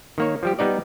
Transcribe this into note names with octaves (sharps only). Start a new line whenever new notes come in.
D#3 A#3 C#5
F3 G3 G4
G3 B3 D#4 D5